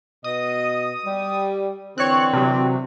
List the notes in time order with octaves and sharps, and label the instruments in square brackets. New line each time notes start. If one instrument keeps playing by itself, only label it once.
[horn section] B2 D#5 [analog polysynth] D#6
[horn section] G3
[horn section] D3 E3 C4 [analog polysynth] C#5 F#6
[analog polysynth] C3 F#3